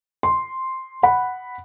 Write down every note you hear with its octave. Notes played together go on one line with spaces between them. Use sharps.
C6
F#5 B5